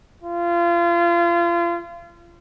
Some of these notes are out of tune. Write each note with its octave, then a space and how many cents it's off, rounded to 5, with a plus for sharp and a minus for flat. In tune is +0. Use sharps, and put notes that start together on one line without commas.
F4 -30